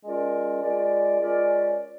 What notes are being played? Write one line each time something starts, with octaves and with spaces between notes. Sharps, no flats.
G#3 C#4 F4 A#4 D5
G#3 C#4 F4 A#4 D5
G#3 C#4 F4 A#4 D5